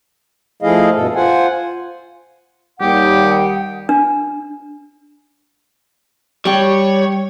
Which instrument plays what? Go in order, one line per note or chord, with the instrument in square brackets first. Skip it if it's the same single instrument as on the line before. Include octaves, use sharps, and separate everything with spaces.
[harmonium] F3 A3 E4 G#4 D#5 F5
G2 B2 A4
F4 C5 F#5 G#5
[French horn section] D#2 G3 [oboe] G4 [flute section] F#5 G5 D#6
[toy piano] D4
[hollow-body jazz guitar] G3 G4 [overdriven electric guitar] C#5